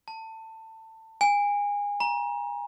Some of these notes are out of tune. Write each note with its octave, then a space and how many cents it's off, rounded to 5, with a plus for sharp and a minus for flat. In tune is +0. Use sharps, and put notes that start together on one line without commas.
A5 +20
G#5 -25
A#5 +30